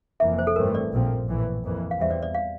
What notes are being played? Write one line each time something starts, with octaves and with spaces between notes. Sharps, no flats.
F1 F2 E3 A#3 E5
C5
A4
A1 G2 E3 A3 C4 A#4
D5
A#1 A#2 F3 C4
A#1 A2 E3
F2 E3 A#3
F5
E2 E3 G3 C4 E5
D5
D5
F5